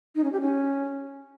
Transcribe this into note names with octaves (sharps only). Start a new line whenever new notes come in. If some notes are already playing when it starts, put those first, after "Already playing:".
D#4
C#4
G4
C#4